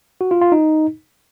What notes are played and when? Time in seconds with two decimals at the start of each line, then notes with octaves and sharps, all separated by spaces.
0.21 F#4
0.31 F4
0.42 F4
0.52 D#4